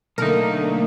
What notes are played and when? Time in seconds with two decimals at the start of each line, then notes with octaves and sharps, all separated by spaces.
0.18 B1 D3 A3 A#3 D#4 A#4